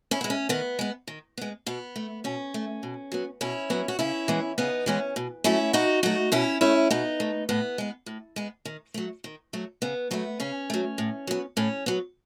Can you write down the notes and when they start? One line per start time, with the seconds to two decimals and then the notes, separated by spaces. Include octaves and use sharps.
0.11 C#4 E4
0.21 G#3 B3
0.30 C#4
0.49 D#3 B3
0.79 G#3 B3
1.08 D#3
1.38 G#3 B3
1.66 B2 B3
1.96 A3
2.24 B2 C#4
2.54 A3
2.83 B2
3.12 F#3 B3
3.41 B2 C#4 E4
3.70 F#3 B3
3.88 F#4
3.99 C#3 C#4 E4
4.28 E3 G#3 B3
4.58 C#3 B3 D#4
4.86 E3 G#3 B3 C#4
5.16 B2
5.44 F#3 A3 C#4 E4
5.73 B2 D#4 F#4
6.03 F#3 A3 D#4 F#4
6.32 B2 C#4 E4
6.61 A3 C#4 E4
6.91 B2 B3 D#4
7.20 A3
7.49 A2 B3
7.78 G#3 B3
8.06 A2
8.36 G#3 B3
8.65 D#3
8.94 F#3 A3
9.24 D#3
9.53 F#3 A3
9.82 C#3 B3
10.11 F#3 A3 B3
10.40 C#3 C#4
10.70 F#3 A3
10.98 A2
11.27 F#3 B3
11.57 A2 C#4
11.86 F#3 B3